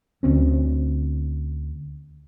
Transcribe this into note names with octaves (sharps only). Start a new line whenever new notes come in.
D2 C4 C#4